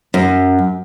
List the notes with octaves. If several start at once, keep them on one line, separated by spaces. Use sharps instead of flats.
F#2